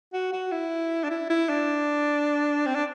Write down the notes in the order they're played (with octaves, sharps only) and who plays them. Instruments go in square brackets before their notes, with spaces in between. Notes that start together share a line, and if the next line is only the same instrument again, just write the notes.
[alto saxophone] F#4
F#4
E4
D4
E4
E4
D4
C4
D4